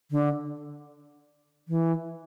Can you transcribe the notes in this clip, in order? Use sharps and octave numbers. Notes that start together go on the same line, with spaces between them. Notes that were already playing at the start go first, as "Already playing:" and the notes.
D3
E3